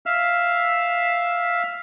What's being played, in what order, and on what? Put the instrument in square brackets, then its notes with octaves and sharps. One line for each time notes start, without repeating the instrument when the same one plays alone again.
[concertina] E5 F5 E6 F6